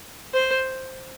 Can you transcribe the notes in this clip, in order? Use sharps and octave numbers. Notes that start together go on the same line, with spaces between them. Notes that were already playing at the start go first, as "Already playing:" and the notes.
C5